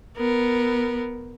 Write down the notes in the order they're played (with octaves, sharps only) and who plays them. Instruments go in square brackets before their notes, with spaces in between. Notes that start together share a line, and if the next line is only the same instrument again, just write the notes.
[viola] B3 A#4